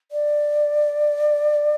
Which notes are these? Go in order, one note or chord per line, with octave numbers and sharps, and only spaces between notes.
D5